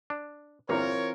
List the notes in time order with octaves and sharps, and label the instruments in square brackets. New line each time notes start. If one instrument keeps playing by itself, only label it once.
[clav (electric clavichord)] D4
[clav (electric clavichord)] G1 E2 A#3 [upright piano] E3 C4 F4 [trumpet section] A#4 C#5